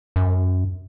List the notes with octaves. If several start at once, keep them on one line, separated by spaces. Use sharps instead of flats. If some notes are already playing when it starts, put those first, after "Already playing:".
F#2